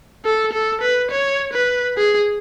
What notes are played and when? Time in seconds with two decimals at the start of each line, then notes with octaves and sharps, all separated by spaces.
0.25 A4
0.53 A4
0.81 B4
1.11 C#5
1.53 B4
1.97 G#4